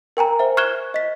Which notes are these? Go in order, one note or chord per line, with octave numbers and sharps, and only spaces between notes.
A#4 G5 G#5 A#5
C5 E5
C#6 F6 F#6 G#6 E7 G7
D#5 B6